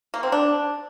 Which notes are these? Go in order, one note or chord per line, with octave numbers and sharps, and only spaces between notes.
A#3
C4
D4